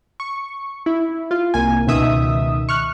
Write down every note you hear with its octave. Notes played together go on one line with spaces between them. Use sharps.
C#6
E4
F4
C2 A#3 G#5
C#2 B2 D#3 E5 D#6
C#6 F6 F#6